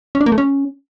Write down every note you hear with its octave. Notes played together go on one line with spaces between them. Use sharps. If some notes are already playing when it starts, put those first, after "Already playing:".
C#4
D4
A#3
A3
C#4